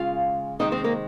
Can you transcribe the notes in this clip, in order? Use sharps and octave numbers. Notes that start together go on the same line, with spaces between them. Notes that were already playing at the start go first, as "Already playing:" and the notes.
Already playing: C#3 G#3 F4 F5
C3 D#3 G#3 C4 D#4 D#5
C4 C5
A#3 A#4